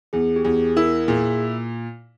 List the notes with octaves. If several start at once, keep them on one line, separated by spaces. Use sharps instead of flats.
E2 G#4
G4
E2 G#4
E4 A#4
A#2 G#4